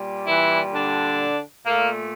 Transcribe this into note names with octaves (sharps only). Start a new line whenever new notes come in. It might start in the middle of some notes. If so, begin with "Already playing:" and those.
Already playing: A#2 G3
E3 E4
D3 D4
A#2 A3 A#3